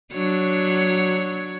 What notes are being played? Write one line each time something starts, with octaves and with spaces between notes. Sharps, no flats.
F#3 D4 C#5